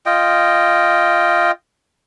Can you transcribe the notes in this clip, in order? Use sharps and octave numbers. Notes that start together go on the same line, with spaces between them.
F4 D#5 G5